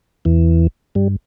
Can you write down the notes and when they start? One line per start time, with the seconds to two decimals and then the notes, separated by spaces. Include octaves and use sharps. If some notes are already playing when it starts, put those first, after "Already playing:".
0.25 E2 E3
0.95 G2 G3